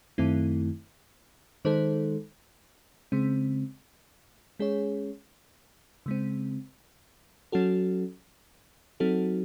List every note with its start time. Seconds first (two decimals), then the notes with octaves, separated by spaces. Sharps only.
0.18 F#2 D#3 A3 C4 E4
1.65 D#3 G#3 D#4 A4 C5
3.12 C#3 G#3 C4
4.59 G#3 C#4 G#4 C#5
6.06 C#3 G#3 C4
7.52 F#3 C#4 F#4 A4
9.00 F#3 C4 D#4 F#4 A4